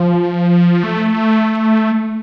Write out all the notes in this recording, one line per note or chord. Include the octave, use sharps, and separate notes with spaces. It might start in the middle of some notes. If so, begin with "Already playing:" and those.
Already playing: F3
A3